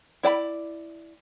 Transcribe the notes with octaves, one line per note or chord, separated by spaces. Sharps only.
E4 D5 A5 B5